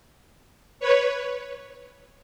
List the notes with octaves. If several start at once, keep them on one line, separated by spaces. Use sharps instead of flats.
B4 C#5